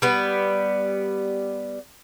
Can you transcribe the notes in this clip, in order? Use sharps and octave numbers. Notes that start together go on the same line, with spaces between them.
G3 B3